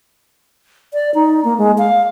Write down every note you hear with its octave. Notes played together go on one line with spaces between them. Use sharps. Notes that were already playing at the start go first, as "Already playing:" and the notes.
D5
D#4
A#3
G#3
F5